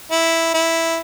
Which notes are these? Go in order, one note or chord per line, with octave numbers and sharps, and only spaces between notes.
E4
E4